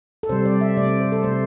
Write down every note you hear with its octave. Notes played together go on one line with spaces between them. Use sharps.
A4
C3 G3 C5
D5
E5
C3 A3 D5
C5
C5
A4
C3 A3 C5